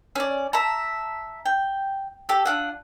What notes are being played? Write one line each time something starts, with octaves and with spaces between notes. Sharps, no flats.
C#4 D5
E5 A5 A#5
G5
G4 A4
D4 F4 F#5